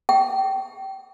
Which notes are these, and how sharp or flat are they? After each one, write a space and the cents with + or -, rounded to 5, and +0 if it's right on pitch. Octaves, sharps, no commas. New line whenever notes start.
G5 -25